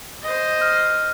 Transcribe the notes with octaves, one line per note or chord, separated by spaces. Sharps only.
C5 D#5
F6